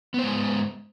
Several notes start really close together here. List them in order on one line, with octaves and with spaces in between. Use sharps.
B3 C5 G#3